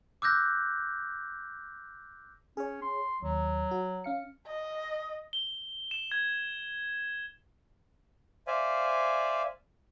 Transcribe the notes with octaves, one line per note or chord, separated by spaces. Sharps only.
D6 E6 F#6 G6 A#6
C#4 G#4 C#5
C6
D#2 F#3
F#4
C#4 F5 C#7
D#5
G7
E7
G#6
C5 D5 E5 F5 G#5